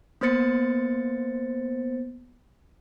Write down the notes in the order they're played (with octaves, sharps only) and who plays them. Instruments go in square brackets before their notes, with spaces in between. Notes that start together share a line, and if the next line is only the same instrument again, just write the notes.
[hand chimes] A#3 B3 C5 A6 C#7